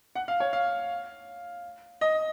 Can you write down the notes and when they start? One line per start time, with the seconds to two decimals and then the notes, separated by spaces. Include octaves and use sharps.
0.15 F#5
0.28 F5
0.40 C#5
0.53 F5
2.01 D#5